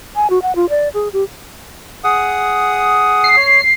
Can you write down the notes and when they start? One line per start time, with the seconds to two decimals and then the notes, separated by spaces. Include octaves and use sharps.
0.16 G#5
0.30 F#4
0.42 F#5
0.56 F4
0.69 D5
0.94 G#4
1.13 G4
2.04 G#4 F#5 D#6
3.24 C7
3.37 C#5